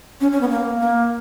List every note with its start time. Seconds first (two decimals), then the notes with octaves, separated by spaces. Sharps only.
0.21 C#4
0.32 C#4
0.41 B3
0.50 A#3
0.80 A#3